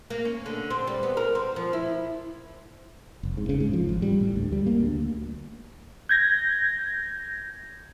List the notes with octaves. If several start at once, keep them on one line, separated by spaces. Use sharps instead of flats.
A#3
C#4
D3
C4
G3
B3
A#4
C4
F3
E4
F1
G#2
C#3
G#2
F3
G#1
G3
A2
D2
G3
A#3
D2
G6 G#6 A#6